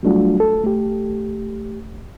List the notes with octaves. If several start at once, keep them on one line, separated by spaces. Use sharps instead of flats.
F#3 G3 A3 D4 F4 F#4
A4
A3 G4